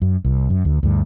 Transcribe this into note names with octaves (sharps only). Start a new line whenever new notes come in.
F#2
C2
F#2
D2
D2 G2